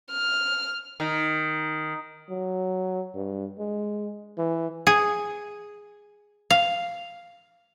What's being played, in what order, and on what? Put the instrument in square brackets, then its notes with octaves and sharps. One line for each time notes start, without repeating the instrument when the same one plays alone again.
[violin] F6
[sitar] D#3
[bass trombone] F#3
G2
G#3
E3
[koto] G#4
F5